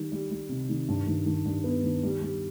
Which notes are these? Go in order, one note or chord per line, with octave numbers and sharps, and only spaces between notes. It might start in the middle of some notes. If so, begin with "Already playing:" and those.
Already playing: D#3 G3
G3
G3
C3
D#3
G2
D#3
D#3
G2
B3
D#3
G3
G3